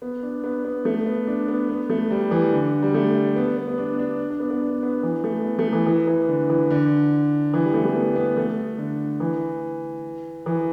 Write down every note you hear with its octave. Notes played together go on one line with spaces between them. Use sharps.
B3
D4
B3
B3
A3
B3
D4
B3
B3
A3
G3
E3
D3
G3
A3
B3
B3
B3
D4
D4
D4
B3
B3
D4
B3
E3
A3
B3
A3
E3
E3
E3
D3
E3
D3
E3
G3
A3
A3
B3
B3
A3
D3
E3
E3